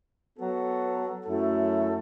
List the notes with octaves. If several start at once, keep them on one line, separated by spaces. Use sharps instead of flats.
F#3 B3 F#4 A4
F#2 F#3 A3 E4 A4